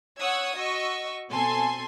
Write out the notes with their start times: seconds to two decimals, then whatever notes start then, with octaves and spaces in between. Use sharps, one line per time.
0.19 C#5 F#5 C#6 D#6 E6 G#6
0.56 F#4 D#5 C#6 E6
1.31 B2 C4 A4 G#5 C6